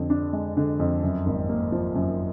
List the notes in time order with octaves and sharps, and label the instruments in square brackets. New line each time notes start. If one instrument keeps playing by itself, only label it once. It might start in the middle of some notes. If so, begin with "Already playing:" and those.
Already playing: [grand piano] F2 D3
D4
G#3
D3
F2
F#2
G#1
A#3
F3
F#2